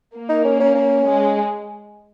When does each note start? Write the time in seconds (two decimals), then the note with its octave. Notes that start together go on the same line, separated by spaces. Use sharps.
0.15 A#3
0.29 D#4
0.45 C#4
0.60 C#4
0.75 C#4
1.06 G#3